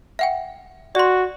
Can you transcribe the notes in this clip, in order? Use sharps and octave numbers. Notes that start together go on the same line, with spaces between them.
E5 F#5 G5
F#4 D5 C6